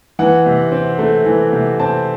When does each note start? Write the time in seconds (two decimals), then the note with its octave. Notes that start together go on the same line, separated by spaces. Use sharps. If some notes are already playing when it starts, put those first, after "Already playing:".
0.19 E3 F#5
0.46 C3
0.72 C4
0.99 A3
1.26 E3
1.53 C3
1.80 C4 A5